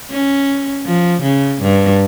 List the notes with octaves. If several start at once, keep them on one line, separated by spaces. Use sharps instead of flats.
C#4
F3
C#3
G2